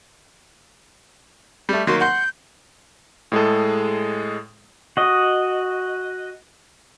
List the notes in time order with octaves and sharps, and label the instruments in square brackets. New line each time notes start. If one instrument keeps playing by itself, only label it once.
[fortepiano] G3 A3
[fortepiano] D#3 F#3 A#3 [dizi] C6
[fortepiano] F#5 C6 [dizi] G6
[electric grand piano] A2 G#3 G#4 A4
[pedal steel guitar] F#4 D#5